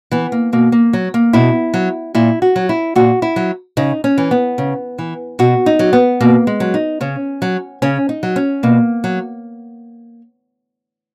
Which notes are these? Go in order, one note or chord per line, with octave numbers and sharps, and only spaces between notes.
E3 B3
A#3
B2 A#3
A#3
F#3
A#3
B2 E4
F#3
A#2 E4
F#4
F#3
E4
A#2 F#4
E4
F#3
C#3 D#4
C#4
E3
B3
C#3
E3
B2 F#4
D#4
F#3
B3
B2 A#3
G#3
F#3
D#4
C#3 C#4
F#3
C#3 C#4
D#4
F#3
C#4
B2 A#3
F#3